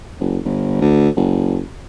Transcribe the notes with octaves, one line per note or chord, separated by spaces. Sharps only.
F#1
G1
D2
F#1